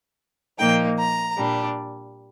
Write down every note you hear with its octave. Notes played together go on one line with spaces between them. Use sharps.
A#2 F3 A#3 D#4 G5
A#5
A#2 G3 D4